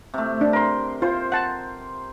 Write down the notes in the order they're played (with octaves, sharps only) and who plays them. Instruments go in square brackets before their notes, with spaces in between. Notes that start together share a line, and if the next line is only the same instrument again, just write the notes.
[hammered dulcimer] C3 A3
[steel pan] D4
[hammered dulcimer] A#4 C6
[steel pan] F4 [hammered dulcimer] C5
[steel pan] F#5 A5